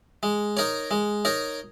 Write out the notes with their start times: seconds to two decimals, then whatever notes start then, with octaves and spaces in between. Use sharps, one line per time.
0.23 G#3
0.57 D#4 A#4 C#5
0.91 G#3
1.25 D#4 A#4 C#5